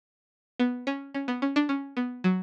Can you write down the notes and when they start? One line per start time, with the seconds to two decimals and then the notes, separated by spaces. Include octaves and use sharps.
0.60 B3
0.87 C#4
1.14 C#4
1.28 B3
1.42 C#4
1.56 D4
1.69 C#4
1.97 B3
2.24 F#3